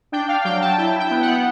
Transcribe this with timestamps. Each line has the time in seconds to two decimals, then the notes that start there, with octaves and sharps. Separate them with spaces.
0.12 D4 G5
0.28 D4 F5
0.45 F#3 G5
0.61 F#3 A5
0.78 E4 G5
0.95 E4 G5
1.11 B3
1.22 F#5
1.28 B3